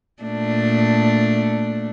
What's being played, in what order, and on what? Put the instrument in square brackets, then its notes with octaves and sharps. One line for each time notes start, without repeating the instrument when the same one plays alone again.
[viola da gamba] A#2 A3 D4